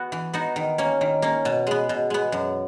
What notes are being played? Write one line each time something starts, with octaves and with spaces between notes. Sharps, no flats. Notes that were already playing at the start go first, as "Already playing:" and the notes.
Already playing: B3 F#4
E3
B3 D#4 F#4
D#3
A#3 C#4
D#3
A#3 C#4
B2
G#3 B3
B2
G#3 B3
F#2